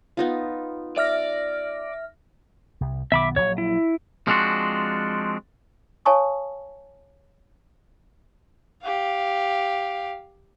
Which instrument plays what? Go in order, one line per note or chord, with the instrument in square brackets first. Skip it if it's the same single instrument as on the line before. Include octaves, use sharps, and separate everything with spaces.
[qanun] B3 D#4 F4
[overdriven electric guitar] D5 [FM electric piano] E5 F6 A#6
[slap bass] C2
[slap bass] B1 D#3 B3 [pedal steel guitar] E5 B5 D6
[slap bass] A#1 D3 F#3 [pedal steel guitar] C#5
[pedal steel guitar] E4
[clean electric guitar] F3 G#3 C4 D4 F#4
[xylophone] C#5 F5 G#5 A5 C#6 D#6
[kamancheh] G4 F5